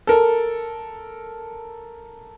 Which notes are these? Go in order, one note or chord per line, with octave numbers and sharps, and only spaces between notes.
A4 A#4